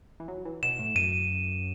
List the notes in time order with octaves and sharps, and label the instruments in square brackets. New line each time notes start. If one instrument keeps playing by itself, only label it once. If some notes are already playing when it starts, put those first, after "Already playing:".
[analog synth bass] E3
F#3
E3
[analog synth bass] B2 [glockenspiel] E7
[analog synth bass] A2
[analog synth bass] F#2 [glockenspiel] D#7